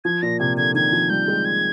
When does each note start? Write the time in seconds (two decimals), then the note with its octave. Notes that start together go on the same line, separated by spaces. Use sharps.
0.05 F3 G#6
0.22 A#2 A#6
0.40 C3 G#6
0.57 D3 G#6
0.74 D#3 G#6
0.92 F3
1.10 G3 G6
1.28 G#3
1.45 G#6